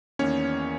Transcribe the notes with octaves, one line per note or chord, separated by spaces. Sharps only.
E2 D#3 A#3 C#4 C#5